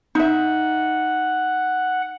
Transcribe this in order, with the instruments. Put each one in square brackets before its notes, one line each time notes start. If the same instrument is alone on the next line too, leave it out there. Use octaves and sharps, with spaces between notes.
[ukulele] D#4 E5 [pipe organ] F#5